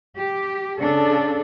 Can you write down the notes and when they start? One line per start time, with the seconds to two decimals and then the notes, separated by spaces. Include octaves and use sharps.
0.17 G4
0.81 C#3 D4 A4